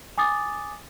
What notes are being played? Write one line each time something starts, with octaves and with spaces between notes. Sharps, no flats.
G#5 D6 D#6 A6